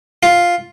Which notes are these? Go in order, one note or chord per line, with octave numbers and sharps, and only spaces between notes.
F4